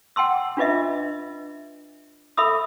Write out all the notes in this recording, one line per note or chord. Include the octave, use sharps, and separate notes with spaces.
F#5 G5 A5 C6 E6
D4 F4 B4 D#5 E5
A4 E5 B5 D#6 E6